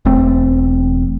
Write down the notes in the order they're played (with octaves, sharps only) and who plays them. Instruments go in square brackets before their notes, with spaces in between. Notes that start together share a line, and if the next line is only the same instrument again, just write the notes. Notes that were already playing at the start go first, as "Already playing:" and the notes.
[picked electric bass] E1 E2 A3 C4